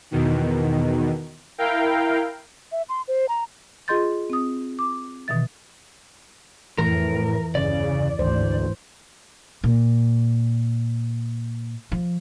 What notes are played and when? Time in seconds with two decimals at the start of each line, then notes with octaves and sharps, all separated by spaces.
0.11 E2 B2 D#3
1.58 E4 A#4 F5 G5
2.72 E5
2.89 C6
3.08 C5
3.29 A#5
3.88 F4 G#4 D#5 C6 G6 A6
4.30 C4 D#6
4.79 D6
5.28 B2 D#3 E3 E5 A6
6.78 F2 A2 E3 A#4
7.55 G1 E2 C#3 D5
8.19 G#1 D2 E3 C5
9.64 A#2
11.92 F3